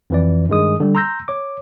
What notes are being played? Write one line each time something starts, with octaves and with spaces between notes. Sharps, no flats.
F2 E3 D5
G2 D#3 G#3 D#6
D3 G3
A#5 C6 E6 G6 A#6
C#5 D6